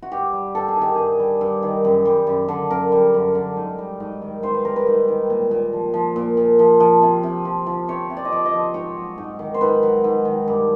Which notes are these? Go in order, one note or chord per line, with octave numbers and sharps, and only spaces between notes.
F#4
G2 G4
G3
G2 A4
G#4
D#3
G4
G2 G#4
G3
G2
D#3
F#2
G3
F#2
D3
F#2 A#4
G3
F#2
D3
G#2
G3
G#2
D#3
G#2 C5
B4
G3 A#4
B4
G#2
D#3
A#2
A#2
F3
F3
A#2
A#2
F3
F3
C3
C3
F3
F3
C3 C#5
C3
D5
D#5
F3 D5
D#5
F3
G#2 C#5
F#3
G#2
D#3
C5
G#2 B4
F#3
G#2
D#3
G2